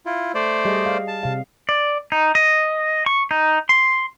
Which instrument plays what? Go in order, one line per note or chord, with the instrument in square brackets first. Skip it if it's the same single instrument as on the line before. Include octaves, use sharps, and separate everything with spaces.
[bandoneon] E4 F4
A3 C5 D5
[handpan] G3 G#4 D#5
F5
[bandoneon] A5
[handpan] C3 F5
[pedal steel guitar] D5
D#4
D#5
C#6
D#4
C6